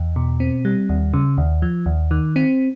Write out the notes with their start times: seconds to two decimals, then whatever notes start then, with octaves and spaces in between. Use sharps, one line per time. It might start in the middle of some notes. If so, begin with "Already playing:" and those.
Already playing: E2
0.16 B2
0.40 C4
0.65 G3
0.89 D#2
1.14 C#3
1.38 D#2
1.62 F3
1.86 D#2
2.11 D#3
2.36 C4